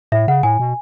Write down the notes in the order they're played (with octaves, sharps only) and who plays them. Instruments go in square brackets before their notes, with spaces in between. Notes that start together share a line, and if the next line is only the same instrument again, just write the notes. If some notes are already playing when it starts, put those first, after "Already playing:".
[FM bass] A2 [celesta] E5
[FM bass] C#3 [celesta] F#5
[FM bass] A2 [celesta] G#5
[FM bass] B2